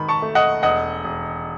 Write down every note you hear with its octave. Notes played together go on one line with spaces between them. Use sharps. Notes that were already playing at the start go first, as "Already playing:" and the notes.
Already playing: G#2 D#3 B5
A5 C#6
A3
D#5 F#5
E1 D#5 F#5
E1